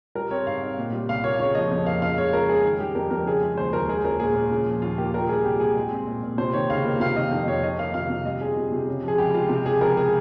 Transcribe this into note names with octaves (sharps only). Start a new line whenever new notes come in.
G3 A#4
C4 C#5
G#2 F5
D#4
A#2
G3
C2 F5
A#3 C#5
C#3 C#5
F3 D#5
F2
A#3 F5
C#3 F5
G#3 C#5
C#2 A#4
C#4 G#4
D#3
G3 G4
F2 A#4
F2 A#4
C#3 G#4
G#3
D#2 C5
D#2 A#4
G#3 G#4
C#4 A#4
A#2 G#4
A#2
C#3
F3
D#2 F4
A#3 G4
A#2 A#4
G3 G#4
C2 G4
A#3 G#4
G#3
C4
A#2
A#2
C3 C5
D#3 C#5
C#2 F5
A#3
C3 F5
D#3 D#5
F2
F2 C#5
D#3 D#5
A#3 F5
C3 F5
C3
G3 D#5
C4 G#4
C3
C3
C#3
F3 G#4
C#2 G4
G#3 F4
C3 G4
F3 G#4
C#2 A#4
G#4